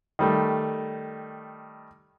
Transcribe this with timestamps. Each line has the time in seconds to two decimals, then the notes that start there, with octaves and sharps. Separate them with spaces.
0.19 D#3 G3 A3